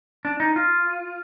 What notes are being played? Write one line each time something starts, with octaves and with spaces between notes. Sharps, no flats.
D4
D#4
F4